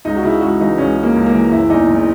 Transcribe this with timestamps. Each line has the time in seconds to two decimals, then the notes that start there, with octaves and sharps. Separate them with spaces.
0.05 C#2 D#4
0.16 F#4
0.23 C#3 E4
0.41 C#2 F#4
0.60 E3 D#4
0.78 C#2 C#4
0.96 C#3
1.03 A#3
1.15 C#2
1.27 A#3
1.32 E3
1.51 F#1 E4
1.69 E2 D#4
1.88 F#1